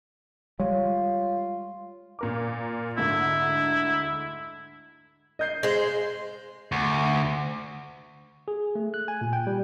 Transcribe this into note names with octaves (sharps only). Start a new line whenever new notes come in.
G3 G#3 F4 C#5
A#2 A#4 D6
D2 G#2 D3 E4
D#5 G6 C7
G#3 C5
D2
G#4
A3
F#6
G#5
A#2
G5
G3